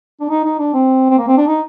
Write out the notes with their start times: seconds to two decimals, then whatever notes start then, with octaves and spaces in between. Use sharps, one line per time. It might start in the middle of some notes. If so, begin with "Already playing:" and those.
0.21 D4
0.30 D#4
0.45 D#4
0.59 D4
0.74 C4
1.10 C4
1.18 A#3
1.28 C4
1.37 D4
1.48 D#4